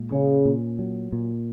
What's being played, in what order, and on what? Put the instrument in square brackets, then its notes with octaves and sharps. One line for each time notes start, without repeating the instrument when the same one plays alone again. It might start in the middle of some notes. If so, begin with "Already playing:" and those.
Already playing: [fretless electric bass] A#2 G#3
[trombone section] C#3 [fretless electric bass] C#4
[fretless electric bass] A#2
F#3
A#2